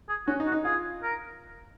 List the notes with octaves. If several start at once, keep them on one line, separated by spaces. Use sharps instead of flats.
G#4
C#4 F#4
D#4
F#4
D#4
F4 G#4
A#4